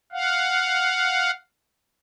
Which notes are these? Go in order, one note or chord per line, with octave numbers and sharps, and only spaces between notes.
F5 F#5